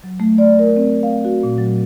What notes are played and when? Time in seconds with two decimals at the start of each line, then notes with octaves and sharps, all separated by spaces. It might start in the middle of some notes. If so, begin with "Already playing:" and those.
0.04 F#3
0.20 A3
0.38 D5
0.59 A#4
0.77 C4
1.03 F5
1.25 F#4
1.43 A#2
1.58 F#3